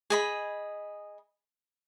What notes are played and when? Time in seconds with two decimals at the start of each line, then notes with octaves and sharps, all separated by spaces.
0.10 G#4 D#5 B5